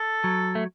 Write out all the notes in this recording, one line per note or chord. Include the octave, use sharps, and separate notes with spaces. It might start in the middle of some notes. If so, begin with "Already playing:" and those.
Already playing: A4
F#3
A3